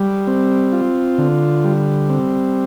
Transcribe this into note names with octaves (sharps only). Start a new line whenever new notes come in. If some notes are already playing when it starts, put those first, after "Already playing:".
Already playing: G3
C4
F4
D3
G3
C4